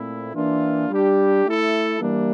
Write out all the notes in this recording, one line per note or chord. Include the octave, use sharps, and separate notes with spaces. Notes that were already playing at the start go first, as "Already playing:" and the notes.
Already playing: A#2 A3 C4 E4
E3 A#3 D4 F4
G3 D4 G4
A3 E4 A4
E3 G3 A#3 D4